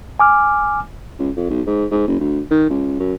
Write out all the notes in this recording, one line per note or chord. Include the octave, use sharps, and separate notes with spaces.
G#5 D6 F6
C#2
F2
B1
G#2
G#2
F#1
D2
D#3
C#2
F#2